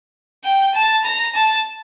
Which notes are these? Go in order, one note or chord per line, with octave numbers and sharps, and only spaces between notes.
G5
A5
A#5
A5